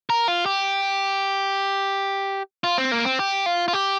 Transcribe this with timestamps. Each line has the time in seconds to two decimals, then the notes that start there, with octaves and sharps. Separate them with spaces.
0.10 A#4
0.28 F4
0.46 G4
2.64 F4
2.78 C4
2.92 A#3
3.05 C4
3.19 G4
3.46 F4
3.68 F4
3.73 G4